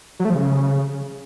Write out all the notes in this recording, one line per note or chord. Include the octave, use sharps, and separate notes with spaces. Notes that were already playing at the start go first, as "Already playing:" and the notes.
F#3
A3
F3
C#3